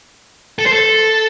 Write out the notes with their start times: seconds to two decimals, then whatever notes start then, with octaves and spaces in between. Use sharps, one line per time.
0.59 A4
0.66 C5
0.73 A4